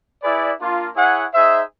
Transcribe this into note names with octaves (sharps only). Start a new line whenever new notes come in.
E4 G#4 B4 D5
A#3 D4 F4
E4 G#4 C#5 F#5
D#4 G#4 C5 E5